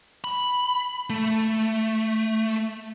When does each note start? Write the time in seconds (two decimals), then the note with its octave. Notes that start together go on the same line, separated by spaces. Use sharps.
0.24 B5
1.10 A3